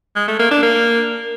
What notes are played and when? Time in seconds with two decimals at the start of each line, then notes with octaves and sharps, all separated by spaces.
0.16 G#3
0.28 A3
0.39 A#3
0.51 D4
0.63 A#3